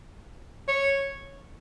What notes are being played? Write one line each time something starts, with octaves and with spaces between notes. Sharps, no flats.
C#5